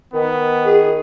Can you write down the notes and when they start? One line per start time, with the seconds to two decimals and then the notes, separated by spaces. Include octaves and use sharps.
0.13 D#3 B3
0.66 G#4